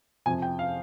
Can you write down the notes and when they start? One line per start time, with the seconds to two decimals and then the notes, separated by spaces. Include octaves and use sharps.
0.26 F2 C3 F3 G#5
0.42 G5
0.59 F5